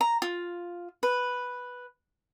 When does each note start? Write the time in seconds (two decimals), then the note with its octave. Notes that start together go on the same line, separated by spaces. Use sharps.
0.01 A#5
0.22 F4
1.03 B4